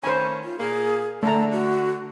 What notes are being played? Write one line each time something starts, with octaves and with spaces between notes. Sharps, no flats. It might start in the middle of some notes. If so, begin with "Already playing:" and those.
D#3 A3 C#4 C5 G#5 B5
F4
A#2 A#3 G#4
D3 A3 A5 A#5
F#4